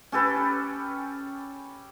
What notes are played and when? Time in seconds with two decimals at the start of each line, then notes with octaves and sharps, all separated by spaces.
0.12 C#4 G4 A4 B4